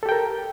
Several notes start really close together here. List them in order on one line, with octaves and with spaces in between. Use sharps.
A4 G4 G5 A#4